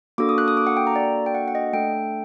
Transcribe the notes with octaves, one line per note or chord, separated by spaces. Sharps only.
A#3 D4 F#4 A4 D6
D#6
F#6
D#6
D6
F#5
G5
A#5
D5
G5
F#5
F#5
D#5
A3 D4 A4 G5